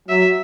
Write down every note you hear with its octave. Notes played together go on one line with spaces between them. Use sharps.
F#3 E5